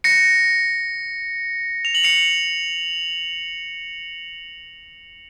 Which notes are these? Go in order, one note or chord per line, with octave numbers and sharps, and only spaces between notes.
A#6 C#7
F7
F#7
C#7 F7